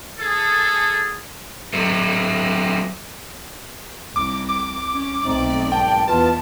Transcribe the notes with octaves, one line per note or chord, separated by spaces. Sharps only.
G#4 A4
F#3 A3
C2 D6
D6
C#4
B1 A3 C4 D#4 D5
G#1 G5 A5
E2 B2 F4 A5